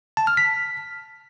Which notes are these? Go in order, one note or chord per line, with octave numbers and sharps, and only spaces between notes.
A5
F6
B6